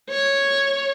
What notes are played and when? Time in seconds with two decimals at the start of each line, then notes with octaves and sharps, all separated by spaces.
0.10 C#5